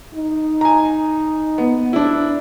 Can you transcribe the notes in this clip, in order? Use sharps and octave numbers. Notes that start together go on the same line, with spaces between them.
D#4
G#5 A#5
B3
D4 E4